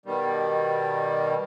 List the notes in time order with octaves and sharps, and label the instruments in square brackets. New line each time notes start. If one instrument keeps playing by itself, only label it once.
[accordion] B2 D#3 G3